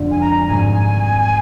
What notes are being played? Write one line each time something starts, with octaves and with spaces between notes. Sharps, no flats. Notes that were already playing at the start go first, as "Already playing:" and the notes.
Already playing: F2 D3 G#3
G#5
A#5
G#1 G#2 G3 C4 G#5